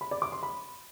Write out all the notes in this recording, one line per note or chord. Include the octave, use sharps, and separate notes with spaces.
B5
D5
D6
C6
B5